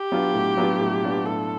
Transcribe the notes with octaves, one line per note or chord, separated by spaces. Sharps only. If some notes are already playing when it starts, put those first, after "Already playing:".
Already playing: G4
F#3 B3 D4 F4
A2
F#3 B3 D4 F4
A2
F#3 B3 D4 F4
A2 A4